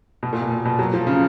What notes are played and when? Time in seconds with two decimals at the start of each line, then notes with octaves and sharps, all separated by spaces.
0.23 B2
0.33 A#2
0.42 B2
0.51 A#2
0.65 B2
0.79 F#3
0.94 F3
1.07 C#3